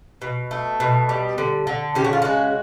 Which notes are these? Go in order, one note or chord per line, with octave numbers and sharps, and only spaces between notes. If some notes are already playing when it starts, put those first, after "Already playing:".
B2
A3
B2
G3
D3
D3
C#3 G4
F#4
F4
G#3 F#4